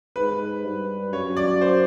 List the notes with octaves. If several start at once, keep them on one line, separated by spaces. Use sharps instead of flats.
G#2 B4
G2
F#2 C#5
D5
C5